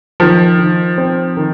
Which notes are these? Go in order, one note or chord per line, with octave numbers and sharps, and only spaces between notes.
D#3 F3
D#3
C4
D#3